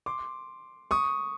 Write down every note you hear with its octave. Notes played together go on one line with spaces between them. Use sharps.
C6 D6
C#6 D#6